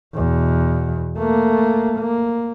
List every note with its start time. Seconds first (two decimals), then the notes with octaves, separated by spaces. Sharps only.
0.15 E2 B2
1.18 A3 A#3
1.99 A#3